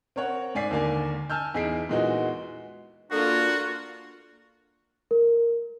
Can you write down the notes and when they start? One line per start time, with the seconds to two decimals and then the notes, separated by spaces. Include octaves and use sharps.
0.16 C4 A#4 C#5 F#5
0.55 G#2 D5 G#5 B6 C7
0.71 D#2 D3 A#3 D5 G#5
1.30 G#5 A5 E6 F6 G6
1.54 E2 D#4 G#4 B6 C7 D7
1.89 A#2 E3 G#3 B3 D#4 F#4
3.11 A#3 D4 F4 F#4 A4 A#4 F#5
5.11 A#4